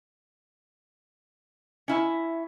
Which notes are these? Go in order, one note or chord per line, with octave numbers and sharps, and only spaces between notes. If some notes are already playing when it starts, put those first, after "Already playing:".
C#4 E4 E5